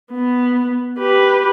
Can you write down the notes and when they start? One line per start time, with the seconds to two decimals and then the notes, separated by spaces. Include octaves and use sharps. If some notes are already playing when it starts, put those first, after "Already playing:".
0.12 B3
0.99 G4 B4